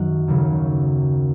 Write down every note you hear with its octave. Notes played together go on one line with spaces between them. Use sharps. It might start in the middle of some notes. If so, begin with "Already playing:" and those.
Already playing: F#2 D#3 F#3 F#5
D#2 C#3 F#3